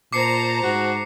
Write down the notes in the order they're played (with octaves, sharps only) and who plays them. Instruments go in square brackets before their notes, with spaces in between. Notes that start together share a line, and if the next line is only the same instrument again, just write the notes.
[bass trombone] A#2 [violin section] C5 A5 A#5 [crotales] D6 C7 C#7
[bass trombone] G#2 [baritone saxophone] F#4